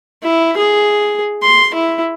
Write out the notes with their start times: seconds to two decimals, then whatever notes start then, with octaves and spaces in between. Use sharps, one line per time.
0.23 E4
0.57 G#4
1.42 C6
1.74 E4